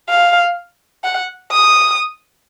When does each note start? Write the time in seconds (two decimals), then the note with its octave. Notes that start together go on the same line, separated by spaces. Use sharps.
0.09 F5
1.04 F#5
1.52 D#6